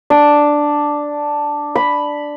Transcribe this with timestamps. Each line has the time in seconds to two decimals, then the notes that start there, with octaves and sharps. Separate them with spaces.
0.10 D4
1.75 B5